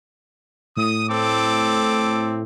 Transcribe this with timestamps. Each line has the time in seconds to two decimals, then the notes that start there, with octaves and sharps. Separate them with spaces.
0.77 A2 D#6
1.09 C4 A4 D6